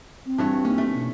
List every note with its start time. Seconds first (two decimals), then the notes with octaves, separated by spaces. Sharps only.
0.26 C4
0.38 G2 E3 C#5 A5
0.65 A#3 C#4 D#4
0.78 A3
0.95 B2 D4